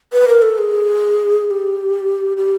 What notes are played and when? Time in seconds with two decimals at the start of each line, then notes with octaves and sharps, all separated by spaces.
0.13 B4
0.28 A#4
0.42 A4
0.58 G#4
1.47 G#4
1.51 G4
2.37 G4